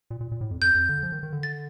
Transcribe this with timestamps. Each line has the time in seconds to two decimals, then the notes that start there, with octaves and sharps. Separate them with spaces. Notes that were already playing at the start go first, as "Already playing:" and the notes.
0.10 A#2
0.21 A#2
0.32 A#2
0.41 A2
0.51 F2
0.61 F2 G6
0.75 F2
0.89 D3
1.03 F3
1.12 D#3
1.23 D#3
1.33 D3
1.43 A6